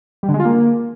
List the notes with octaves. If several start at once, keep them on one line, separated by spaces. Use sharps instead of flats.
G3
D3
G#3
F4
A#3